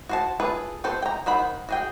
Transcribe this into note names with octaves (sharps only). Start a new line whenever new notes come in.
F#4 C5 A5
F4 G#4 A4 B4
C4 A4 B4 C5
G5 A#5
D#3 C5 F#5 B5
F#4 G#4 G5